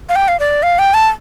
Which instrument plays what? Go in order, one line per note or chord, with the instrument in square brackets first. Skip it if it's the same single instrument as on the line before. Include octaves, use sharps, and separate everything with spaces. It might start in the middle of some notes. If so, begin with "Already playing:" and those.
[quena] F5
G5
F5
D5
F5
G5
A5